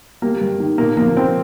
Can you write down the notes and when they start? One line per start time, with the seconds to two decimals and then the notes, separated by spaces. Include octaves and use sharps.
0.22 G3 A#3
0.41 G2
0.60 D#3
0.78 A#2 A#3
0.97 F3 A#3
1.16 F3 C4